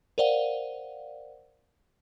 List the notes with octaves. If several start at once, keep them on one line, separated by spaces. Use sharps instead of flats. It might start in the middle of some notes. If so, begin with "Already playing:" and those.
A#4 C5 D5 F5 F#5